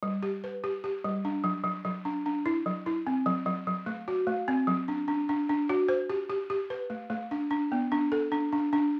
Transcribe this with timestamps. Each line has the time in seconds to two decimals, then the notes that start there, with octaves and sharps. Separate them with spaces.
0.03 G3
0.23 G4
0.44 B4
0.64 G4
0.84 G4
1.04 G3
1.25 D4
1.44 F#3
1.64 F#3
1.85 F#3
2.05 D4
2.26 D4
2.46 E4
2.66 F#3
2.86 E4
3.07 C4
3.26 F#3
3.46 F#3
3.67 F#3
3.86 A3
4.08 F#4
4.27 A3
4.48 C4
4.67 F#3
4.88 D4
5.08 D4
5.29 D4
5.49 D4
5.69 F#4
5.89 C5
6.10 G4
6.30 G4
6.50 G4
6.70 B4
6.90 A3
7.10 A3
7.31 D4
7.51 D4
7.72 B3
7.92 D4
8.12 A4
8.32 D4
8.53 D4
8.73 D4